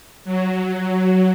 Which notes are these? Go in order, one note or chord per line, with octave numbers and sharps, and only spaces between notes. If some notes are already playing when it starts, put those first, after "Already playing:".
F#3